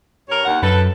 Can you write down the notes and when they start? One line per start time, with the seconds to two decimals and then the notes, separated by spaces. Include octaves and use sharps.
0.29 G2 A#4 C#5
0.46 D#2 F#5
0.63 F#2 A4 B4